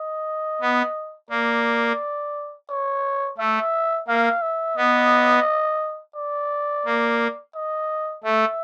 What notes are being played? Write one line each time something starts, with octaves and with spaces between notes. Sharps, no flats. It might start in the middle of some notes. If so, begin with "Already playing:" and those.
Already playing: D#5
B3
A#3 D5
C#5
A3 E5
A#3 F5
E5
B3 D#5
D5
A#3
D#5
A3 E5